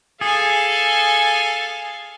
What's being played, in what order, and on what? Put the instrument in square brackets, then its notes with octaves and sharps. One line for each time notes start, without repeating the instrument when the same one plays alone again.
[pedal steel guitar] G#4 [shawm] A4 [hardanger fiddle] F5 G#5